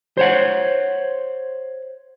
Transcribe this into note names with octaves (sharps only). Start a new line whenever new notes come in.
C5 C#5 F#5